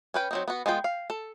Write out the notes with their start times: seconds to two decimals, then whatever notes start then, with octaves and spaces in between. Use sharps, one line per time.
0.14 C#4 B4 G5
0.31 F#3 C4 D#4
0.48 B3 F#4
0.66 G#3 B3 F4 G5
0.84 F5
1.10 A4